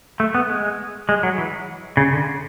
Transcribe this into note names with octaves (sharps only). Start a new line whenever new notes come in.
A3
B3
G#3
G#3
F#3
E3
C#3
D3